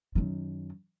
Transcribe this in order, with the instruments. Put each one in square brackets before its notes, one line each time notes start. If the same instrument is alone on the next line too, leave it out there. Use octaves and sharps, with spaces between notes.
[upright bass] F#2 D#3